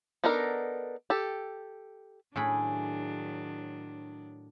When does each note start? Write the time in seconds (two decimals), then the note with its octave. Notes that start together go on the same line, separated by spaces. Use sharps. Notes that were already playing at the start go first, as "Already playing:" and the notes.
0.24 B3 D4 D#4 A4 A#4
1.10 G4 A4
2.36 A2 D#3 F#3 D4 G#4 B5